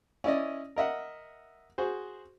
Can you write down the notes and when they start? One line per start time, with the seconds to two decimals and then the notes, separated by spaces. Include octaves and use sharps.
0.24 C#4 E4 D5 D#5
0.76 A#4 D#5 E5 F#5
1.78 F#4 G#4 C5